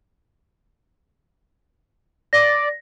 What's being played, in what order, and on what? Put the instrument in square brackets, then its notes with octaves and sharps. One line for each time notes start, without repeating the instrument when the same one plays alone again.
[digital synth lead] D5 [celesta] A#6